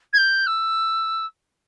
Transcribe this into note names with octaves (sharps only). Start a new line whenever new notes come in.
G#6
G6
E6